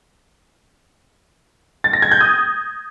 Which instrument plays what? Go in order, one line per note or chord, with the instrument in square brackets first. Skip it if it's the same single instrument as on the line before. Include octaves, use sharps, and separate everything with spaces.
[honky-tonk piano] A6
A#6
G#6
G6
D#6